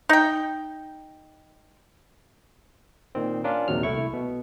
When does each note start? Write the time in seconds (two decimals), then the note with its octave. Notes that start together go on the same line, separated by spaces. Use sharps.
0.09 D#4 G5
3.15 A#2 D#3 C4
3.44 C#4 D4 F4 A#4
3.68 A#1 D#2 C3 D#3 F#3 F6
3.83 C2 A3 E4 C#6
4.13 B2